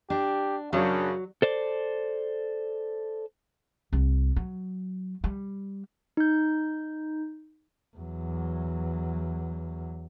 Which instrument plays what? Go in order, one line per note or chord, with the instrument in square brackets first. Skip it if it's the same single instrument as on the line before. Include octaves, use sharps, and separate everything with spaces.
[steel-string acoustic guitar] D4 [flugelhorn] G4
[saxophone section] F#2 C#3 [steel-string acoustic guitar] F#3 [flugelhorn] D4
[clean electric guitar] A4 C5 D5
[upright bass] C2
F#3
G3
[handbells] D#4 G6
[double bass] E2 F#3